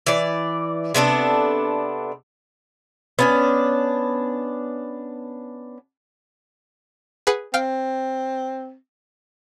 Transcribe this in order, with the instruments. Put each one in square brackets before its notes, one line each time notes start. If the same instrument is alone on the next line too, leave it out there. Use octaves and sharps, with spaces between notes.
[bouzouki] E3 D5
C3 B3 D4 A4
B3 C#4 D4
[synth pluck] G#4 B4 F#5
[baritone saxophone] C4 [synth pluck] F5 G5 F6